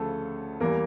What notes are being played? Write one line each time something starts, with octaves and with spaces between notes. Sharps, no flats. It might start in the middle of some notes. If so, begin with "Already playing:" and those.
Already playing: D2 C#3 F3 A3 A4
E2 E3 G3 A#3 A#4